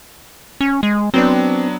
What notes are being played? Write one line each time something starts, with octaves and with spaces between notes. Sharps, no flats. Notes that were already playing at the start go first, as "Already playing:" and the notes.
C#4
G#3
F#3 B3 C4 D4